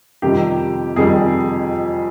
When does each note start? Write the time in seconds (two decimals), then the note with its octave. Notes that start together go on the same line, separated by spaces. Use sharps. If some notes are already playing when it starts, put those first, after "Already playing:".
0.22 F2 C3 D#3 G3 G4
0.96 F2 C3 D#3 G3 G#4